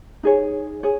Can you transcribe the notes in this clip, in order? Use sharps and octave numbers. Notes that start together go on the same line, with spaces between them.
D#4 G#4 C#5
G#4 C#5